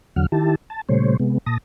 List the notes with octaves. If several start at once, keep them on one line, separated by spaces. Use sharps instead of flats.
E2 D3 F#3 F#5 F6
D#3 E4 G4 A5
A5
A#2 C#3 G3 A3 C5 C#5
C3 G#3 B3
A#2 A5 D#6 A#6